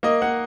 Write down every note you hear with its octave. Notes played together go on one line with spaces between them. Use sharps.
A#3 D#5
A#3 F#5